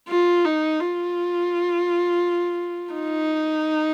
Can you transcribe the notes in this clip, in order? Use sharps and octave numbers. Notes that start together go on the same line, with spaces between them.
F4
D#4
F4
D#4